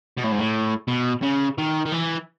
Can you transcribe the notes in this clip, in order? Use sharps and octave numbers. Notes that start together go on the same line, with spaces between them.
B2
A2
G#2
A2
B2
C#3
D#3
D#3
E3